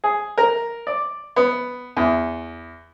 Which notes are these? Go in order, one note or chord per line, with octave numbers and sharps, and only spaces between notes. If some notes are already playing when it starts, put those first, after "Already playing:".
G#4
A#4
D5
B3
E2